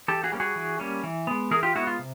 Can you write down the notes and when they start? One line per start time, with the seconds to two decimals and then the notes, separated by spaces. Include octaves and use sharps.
0.08 E3 G4 A4
0.24 F#4 G#4
0.32 G3 A#3 C#4
0.40 F#4 G#4
0.56 E3
0.80 G3 A#3 C#4
1.03 E3
1.27 G#3 B3
1.51 E3 G#4 A#4
1.63 F4 G4
1.75 G#3 B3 E4 F#4
1.87 F4
1.99 C3